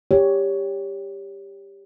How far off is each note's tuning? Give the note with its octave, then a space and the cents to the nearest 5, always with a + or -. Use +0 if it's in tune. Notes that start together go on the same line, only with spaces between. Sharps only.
G4 +10 C#5 +15